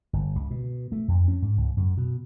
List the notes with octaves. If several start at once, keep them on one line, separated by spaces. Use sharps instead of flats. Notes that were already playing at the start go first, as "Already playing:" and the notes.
G1
C#2
B2
A3
F2
C#4
G#2
C#2
F#2
B2